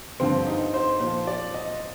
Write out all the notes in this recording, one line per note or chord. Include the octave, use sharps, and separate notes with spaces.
G2 D3 F3 C4
D#4
C5
A#2 F3 C5
D5
D#5